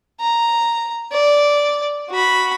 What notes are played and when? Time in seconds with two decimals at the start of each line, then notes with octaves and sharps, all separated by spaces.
0.21 A#5
1.12 D5
2.10 F#4 B5